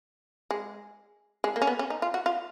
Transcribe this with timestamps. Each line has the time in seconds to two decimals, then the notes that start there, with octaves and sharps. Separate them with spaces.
0.51 G#3
1.44 G#3
1.56 A#3
1.62 C#4
1.67 B3
1.79 C#4
1.90 D#4
2.02 F4
2.14 F#4
2.26 F4